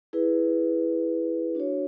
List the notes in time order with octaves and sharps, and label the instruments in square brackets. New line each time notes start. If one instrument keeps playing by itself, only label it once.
[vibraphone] E4 G#4 B4
D4 F#4 C#5